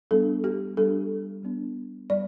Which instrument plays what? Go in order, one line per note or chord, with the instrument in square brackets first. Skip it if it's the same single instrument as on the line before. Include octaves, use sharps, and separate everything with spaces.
[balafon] G3 B3 D4 A4
G4
G3 D4 A4
G3 B3 D4
G3 D5